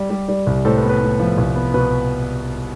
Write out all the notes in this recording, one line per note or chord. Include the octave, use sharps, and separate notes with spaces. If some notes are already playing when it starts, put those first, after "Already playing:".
Already playing: G3
G3
G3
C2
A2 A4 C5
B4
B3
B4
A2
F3
C2
B3
B2 B4